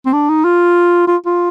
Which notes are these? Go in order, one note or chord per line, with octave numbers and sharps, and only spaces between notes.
C4
D4
D#4
F4
F4
F4